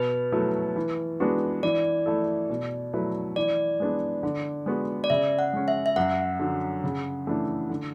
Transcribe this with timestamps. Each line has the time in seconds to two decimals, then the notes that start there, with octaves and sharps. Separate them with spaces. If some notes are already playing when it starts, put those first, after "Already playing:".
Already playing: B2 B4
0.32 F#3 A3 E4 A4
0.76 E3
1.20 G#3 B3 D4 F#4
1.63 E3 D5
2.06 A3 E4 A4
2.50 B2
2.93 F#3 A3 E4 B4
3.36 E3 D5
3.80 G#3 B3 D4
4.23 D3
4.66 G#3 B3 F#4
5.04 D5
5.10 C#3 E5
5.39 F#5
5.53 G#3 C#4
5.68 E5
5.86 E5
5.96 F#2 F#5
6.39 D3 F#3
6.84 C#3
7.27 E3 A3 D4
7.69 D3